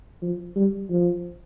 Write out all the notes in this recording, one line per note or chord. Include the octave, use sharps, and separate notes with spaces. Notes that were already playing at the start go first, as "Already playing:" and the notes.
F3
G3
F3